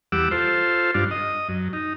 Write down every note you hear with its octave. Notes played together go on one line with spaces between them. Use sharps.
E2 G3 F#5 D6 E6
F4 A4 C5
G2 D4 F4
D#5
F#2
D#4